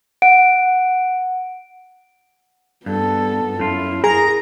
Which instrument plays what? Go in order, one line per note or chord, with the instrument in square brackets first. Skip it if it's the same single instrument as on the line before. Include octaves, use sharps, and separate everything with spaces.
[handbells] F#5 D7
[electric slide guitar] G2 [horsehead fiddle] B3 A4
[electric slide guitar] F#2 F4 [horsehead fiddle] E4
[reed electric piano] G#4 [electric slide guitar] A#4 [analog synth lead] A#5